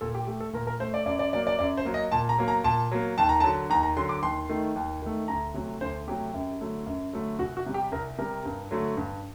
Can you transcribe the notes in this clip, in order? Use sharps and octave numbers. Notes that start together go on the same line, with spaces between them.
A#2 A4
G4
A3 G4
A4
A#2 A#4
A#4
A3 C5
D5
F#2 D5
D5
F#3 A#3 D5
D5
F#2 D5
C5
F#3 A#3
D#5
A#2 A5
A#5
F#3 A#3
A#5
A#2 A5
F#3 A#3
D#2 A5
A#5
D3 F#3 A5
D#2 A#5
A#5
D3 F#3 C6
D6
D#2 C6
D#3 A3
D#2
D#3 A3
D2 A#5
C3 F#3 A3
D2 C5
C3 F#3 A3 G4
F#2
D3 F#3 A3
F#2
D3 F#3 A3
C2 F#4
F#4
C3 G3
G4
C2 A#4
C3 G3 A#4
G2
D3 F#3 A3
G2